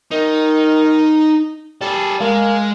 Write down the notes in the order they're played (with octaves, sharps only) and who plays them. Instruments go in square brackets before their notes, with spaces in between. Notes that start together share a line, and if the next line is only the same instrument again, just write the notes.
[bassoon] D#3 [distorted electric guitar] D#4
[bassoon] G3 [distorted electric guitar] G#4 A4
[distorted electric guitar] G#3 [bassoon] A#3